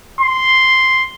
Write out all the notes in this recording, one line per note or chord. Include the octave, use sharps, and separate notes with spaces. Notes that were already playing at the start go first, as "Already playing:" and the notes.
C6